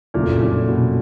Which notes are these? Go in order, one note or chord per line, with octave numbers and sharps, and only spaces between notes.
F#1 F2 A#2 C#3 F#3 A3
A#2
B2